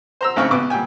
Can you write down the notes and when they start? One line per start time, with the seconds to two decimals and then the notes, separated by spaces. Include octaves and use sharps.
0.21 C5 A#5 E6
0.36 A1 G#2 C#3 C4 F5 C#6
0.51 A#1 B2 B4 D6
0.70 A#2 G3 G5 G#5